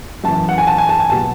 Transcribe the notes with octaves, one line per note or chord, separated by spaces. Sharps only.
F#2 E3 A5
F#5
G#5
A5
G#5
A5
G#5
B2 F#3 A5